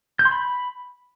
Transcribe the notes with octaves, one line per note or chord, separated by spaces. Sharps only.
G6
C6
B5